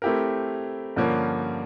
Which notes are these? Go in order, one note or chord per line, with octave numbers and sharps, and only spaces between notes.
A3 C4 E4 G4 A#4
G2 D3 F3 A#3 C#4